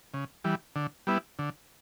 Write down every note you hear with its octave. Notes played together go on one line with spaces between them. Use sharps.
C#3
E3 G3
D3
G3 B3 E4
D3